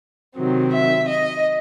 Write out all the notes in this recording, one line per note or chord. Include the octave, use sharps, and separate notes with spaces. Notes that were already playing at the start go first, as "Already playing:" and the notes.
C3 D#3 F#3 C4
E5
D#5